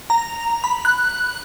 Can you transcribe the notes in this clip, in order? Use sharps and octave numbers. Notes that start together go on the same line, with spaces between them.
A#5
B5
F#6